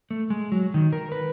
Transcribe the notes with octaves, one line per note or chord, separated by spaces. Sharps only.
A3
G#3
F#3
D#3
A#4
B4